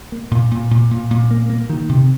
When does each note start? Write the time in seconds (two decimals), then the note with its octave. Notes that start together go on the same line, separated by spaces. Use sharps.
0.12 A#3
0.31 A#2
0.51 A#2
0.71 A#2
0.91 A#2
1.11 A#2
1.31 A#3
1.50 A#3
1.69 D#3
1.89 C3